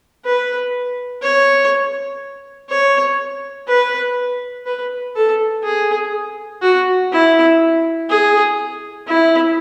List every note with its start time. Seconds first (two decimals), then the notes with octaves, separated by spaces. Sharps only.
0.25 B4
1.23 C#5
2.70 C#5
3.68 B4
4.66 B4
5.16 A4
5.64 G#4
6.62 F#4
7.12 E4
8.10 G#4
9.08 E4